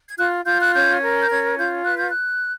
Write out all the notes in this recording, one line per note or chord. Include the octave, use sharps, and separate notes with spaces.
G#6
F4 F#6
F4 G6
F#6
C#4 G6
A#4
G6
C#4 G#6
F4 G6
B4 F#6
G6
F#6